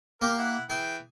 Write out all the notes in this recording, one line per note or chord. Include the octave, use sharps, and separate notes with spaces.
A#3 G4 A#4
E4 F#5
E3 G#4 G5